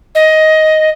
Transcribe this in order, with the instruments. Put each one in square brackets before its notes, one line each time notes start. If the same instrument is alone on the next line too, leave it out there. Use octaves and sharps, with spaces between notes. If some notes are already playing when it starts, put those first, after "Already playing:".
[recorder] D#5